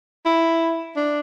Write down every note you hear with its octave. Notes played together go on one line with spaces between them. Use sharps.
E4
D4